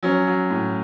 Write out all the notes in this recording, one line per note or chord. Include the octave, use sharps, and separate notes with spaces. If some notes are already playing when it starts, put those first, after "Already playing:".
F#3 C#4
F#3
A2